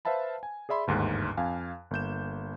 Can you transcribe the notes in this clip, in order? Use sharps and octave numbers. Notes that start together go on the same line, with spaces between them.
B4 C5 E5 F5 A5 B5
G#5
G#4 D5 E5 B5 C6
G1 D#2 G#2 F#6
F2 F5 G#5
G1 A#3 G6 E7